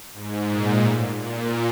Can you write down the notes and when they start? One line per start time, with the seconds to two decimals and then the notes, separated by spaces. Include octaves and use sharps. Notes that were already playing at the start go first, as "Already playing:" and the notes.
0.14 G#2
0.49 A#2
0.82 A2
1.18 A#2